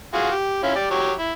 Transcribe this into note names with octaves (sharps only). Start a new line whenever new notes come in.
F4 F#4 G#4
G4
C#4 E4 F4
G4 D5
F#3 G4 C#5
E4